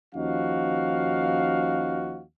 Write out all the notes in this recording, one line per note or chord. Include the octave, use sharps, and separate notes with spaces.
D#2 F3 C#4 D#4 F#4 F5